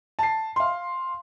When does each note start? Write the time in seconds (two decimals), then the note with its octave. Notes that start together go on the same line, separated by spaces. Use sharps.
0.19 A5 C7
0.56 F5 C6